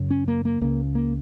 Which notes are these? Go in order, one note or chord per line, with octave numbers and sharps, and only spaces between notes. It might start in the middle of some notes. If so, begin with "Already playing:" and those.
Already playing: F#2 C#3
C#4
A#3
A#3
C#2 C#3 A#3
A#3